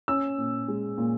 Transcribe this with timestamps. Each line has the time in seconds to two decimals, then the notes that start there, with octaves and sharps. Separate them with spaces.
0.08 C#4 E6
0.38 A#2
0.68 G#3
0.98 A#2